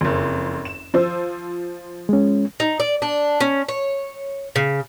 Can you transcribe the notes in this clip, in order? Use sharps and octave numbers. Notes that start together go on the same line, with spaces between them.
F#1 F2
E7
F3 C5 E6
G#3 C#4
D#4
D5
D4
C#4
C#5
C#3